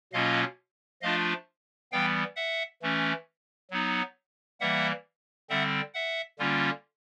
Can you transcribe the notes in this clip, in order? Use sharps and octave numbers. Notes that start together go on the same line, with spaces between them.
B2 F#3 A#3 C#4 F4 D#5 F5
F3 A3 D4 F4 D#5 F5
E3 G3 B3 F5 G5
E5 F#5
E3 A3 C#4
F#3 B3 D#4
E3 G3 A#3 E5 F#5
D3 G3 C4 E5 F#5
E5 F#5
D3 G3 A#3 C#4 F4